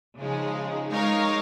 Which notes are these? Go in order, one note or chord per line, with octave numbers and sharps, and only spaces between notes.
C#3 F3 G#3 D#4 G#4
G#3 D#4 A#4 C#5 F5